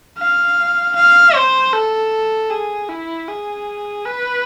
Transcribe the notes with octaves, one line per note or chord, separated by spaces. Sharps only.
F5
F5
C5
A4
G#4
E4
G#4
B4